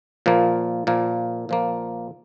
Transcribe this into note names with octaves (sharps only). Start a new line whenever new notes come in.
A#2 F3 A#3
A#2 F3 A#3
A#2 F3 A#3